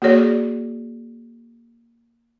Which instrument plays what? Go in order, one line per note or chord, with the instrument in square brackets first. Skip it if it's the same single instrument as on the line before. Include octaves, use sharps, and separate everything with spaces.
[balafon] A#3 F#4 G#4 A4 C#5 D5